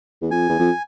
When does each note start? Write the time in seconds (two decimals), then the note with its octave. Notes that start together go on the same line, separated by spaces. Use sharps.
0.22 E2
0.31 F2 G#5
0.49 E2
0.60 F2